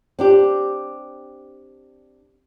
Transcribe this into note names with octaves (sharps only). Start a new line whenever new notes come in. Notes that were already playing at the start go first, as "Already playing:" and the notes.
C4 D4 G4